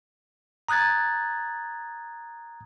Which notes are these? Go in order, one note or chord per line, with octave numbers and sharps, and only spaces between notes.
A#5 D#6 F#6 G#6 A6